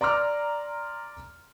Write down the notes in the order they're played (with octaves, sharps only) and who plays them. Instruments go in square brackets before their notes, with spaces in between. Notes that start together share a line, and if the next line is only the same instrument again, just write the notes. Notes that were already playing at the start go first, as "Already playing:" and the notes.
[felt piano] D5 A#5 C6 D6 F6